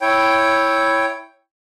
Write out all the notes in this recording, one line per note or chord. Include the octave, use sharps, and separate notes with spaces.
E4 C#5 G5